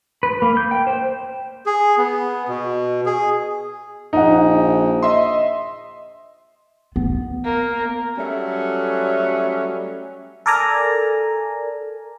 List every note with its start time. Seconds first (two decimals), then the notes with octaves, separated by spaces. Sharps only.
0.23 B4
0.42 A#3
0.57 G6
0.71 G5
0.87 C5
1.66 G#4
1.98 B3
2.48 B2
3.06 G#4
4.13 A#1 D#4 F#5
5.03 D#5 E5 C6
6.96 B3
7.44 A#3
8.17 F#3 G3 A3 C#4
10.46 A4 A#4 D5 G#5 A#5